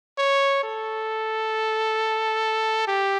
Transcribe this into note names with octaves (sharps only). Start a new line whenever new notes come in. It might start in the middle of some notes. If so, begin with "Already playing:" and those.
C#5
A4
G4